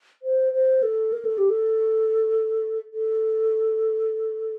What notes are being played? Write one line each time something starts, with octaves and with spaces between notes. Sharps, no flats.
C5
C5
A4
A#4
A4
G4
A4
A4